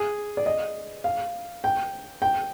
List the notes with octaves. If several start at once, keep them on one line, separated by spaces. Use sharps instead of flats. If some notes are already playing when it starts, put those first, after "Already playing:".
Already playing: G#4
D5
D#5
F5
G5
G5